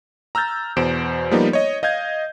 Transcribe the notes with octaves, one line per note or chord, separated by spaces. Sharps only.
A#5 E6 F6 G6 A6
E2 B2 C5 G6 D7 E7
F3 G3 A#3 B3 D#4
C#5 D#5
D#5 F5 G6 G#6